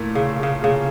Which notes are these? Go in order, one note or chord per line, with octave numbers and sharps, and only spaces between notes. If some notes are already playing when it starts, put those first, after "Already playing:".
Already playing: A#2 A3 E4 A#4
C#3
C#3
C#3